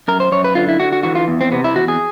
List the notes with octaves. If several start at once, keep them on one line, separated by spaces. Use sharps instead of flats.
F#2 A#4
C5
F#2 C#5
B4
D3 F4
E4
D3 F#4
F#4
E3 F#4
F4
E2
C4
C3 B3
E4
E2 F#4
G#4